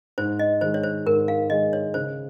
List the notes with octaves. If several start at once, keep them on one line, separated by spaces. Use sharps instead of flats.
G#2 C5
D#5
D#3 G#3 C5
C#5
C5
G#2 A#4
F5
D#3 G#3 D#5
C#5
C#3 C5